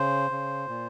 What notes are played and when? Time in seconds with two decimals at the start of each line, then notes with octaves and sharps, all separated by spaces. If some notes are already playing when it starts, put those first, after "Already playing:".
Already playing: C#3 C5
0.31 C#3
0.68 A#2